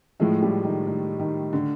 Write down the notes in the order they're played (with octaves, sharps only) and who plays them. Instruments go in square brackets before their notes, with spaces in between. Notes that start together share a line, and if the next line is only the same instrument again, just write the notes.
[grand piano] A2 F3 G#3 [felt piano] A3
[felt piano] G3
D#3
D#3
D#3
D3